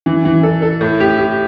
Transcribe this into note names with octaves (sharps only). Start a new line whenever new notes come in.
E3
E3
A4
A4
A2
G4
G4